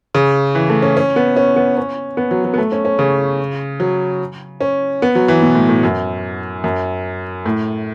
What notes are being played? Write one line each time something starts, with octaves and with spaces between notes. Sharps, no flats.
C#3
E3
A3
C#4
C#4
B3
C#4
B3
C#4
B3
F#3
F#3
B3
A3
C#4
C#4
C#3
F#3
C#4
B3
F#3
E3
B2
A2
A2
F#2
F#2
A2